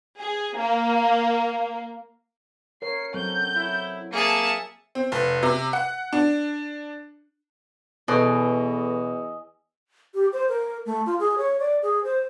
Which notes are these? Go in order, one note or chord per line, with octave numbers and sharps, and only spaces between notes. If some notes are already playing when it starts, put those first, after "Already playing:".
G#4
A#3
A#4 C#5 C7
F#3 C4 A4 G6
E4
A#3 G#4 E5 A5 C#7
C4
F1
C3
F#5
D4
E2 B2 A4 B4 D#5 E5 G#5
G4
C5
A#4
A3
F4
G#4
C#5
D5
G#4
C5